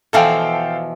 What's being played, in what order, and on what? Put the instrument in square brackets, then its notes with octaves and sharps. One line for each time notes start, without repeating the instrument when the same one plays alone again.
[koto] B2 E3 F3 [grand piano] A4 F5 G5